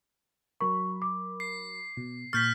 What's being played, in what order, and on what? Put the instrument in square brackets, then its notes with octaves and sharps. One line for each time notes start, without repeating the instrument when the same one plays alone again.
[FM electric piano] F#3 A#4 B5 [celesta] C#6
[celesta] D6
[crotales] C7
[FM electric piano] B2
[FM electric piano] A#2 C#6 [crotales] F6 G6 B6 [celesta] A6